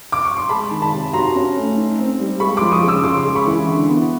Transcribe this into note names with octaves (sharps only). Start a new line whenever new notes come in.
D6
C#6
C6
G#3 A5 B5
D#3
A5 B5
C3
F#4 A#5 C6
C#4
A3
D#4
C4
G3
G#3 B5 C#6
C6 D6
F3
C#6 D#6
C#3
D6 E6
C#3 C6 D6
G#3
B5 C#6
E3
D3
B3